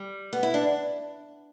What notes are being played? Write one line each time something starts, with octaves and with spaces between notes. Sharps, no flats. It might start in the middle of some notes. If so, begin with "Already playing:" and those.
Already playing: G3
B3
E4
D4